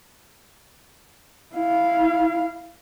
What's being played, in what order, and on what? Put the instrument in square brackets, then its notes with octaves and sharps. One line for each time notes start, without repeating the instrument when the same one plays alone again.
[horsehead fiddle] E4 F5